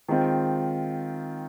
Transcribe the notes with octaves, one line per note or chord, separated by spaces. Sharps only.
D#3 G#3 C4 F4